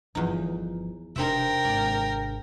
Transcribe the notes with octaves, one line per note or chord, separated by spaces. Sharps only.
G1 E2 F3 D#4
E1 C3 D4 D#4 A#4 C5 E5 G5
G#1 D5